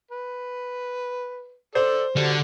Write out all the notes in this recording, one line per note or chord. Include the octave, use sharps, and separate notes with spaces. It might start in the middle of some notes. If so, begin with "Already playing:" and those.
B4
A4 C5 D5
D3 F#3 G3